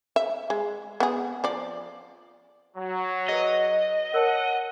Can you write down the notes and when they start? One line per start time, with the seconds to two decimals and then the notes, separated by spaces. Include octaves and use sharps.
0.16 E5
0.50 G#3
1.00 B3 G#4
1.44 F3 D5
2.77 F#3
3.29 G#4 B4 D#5
4.14 A#4 C#5 F#5 A5